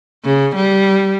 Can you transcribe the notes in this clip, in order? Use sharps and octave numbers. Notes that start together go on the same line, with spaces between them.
C#3
G3